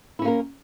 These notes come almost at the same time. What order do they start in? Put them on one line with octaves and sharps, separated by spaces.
E4 C#4 A#3 A#4